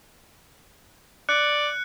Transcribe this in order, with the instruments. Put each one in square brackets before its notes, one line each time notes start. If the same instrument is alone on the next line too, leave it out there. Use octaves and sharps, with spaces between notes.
[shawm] D5 [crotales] F#6 C#7